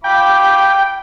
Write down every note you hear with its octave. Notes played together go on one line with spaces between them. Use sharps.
F4 G5 B5 D6